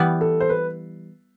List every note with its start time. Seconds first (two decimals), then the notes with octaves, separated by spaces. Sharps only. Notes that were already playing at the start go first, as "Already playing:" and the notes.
Already playing: E3 G3 B3
0.21 A4
0.40 C5
0.50 B4